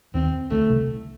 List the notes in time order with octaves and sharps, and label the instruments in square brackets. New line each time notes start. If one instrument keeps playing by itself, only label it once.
[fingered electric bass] D#2 D#3 [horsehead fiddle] C4
[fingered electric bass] D2 D3 [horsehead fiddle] A3
[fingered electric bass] C2 C3